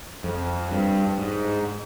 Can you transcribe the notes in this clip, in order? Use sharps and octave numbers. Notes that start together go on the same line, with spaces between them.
F2
G2
G#2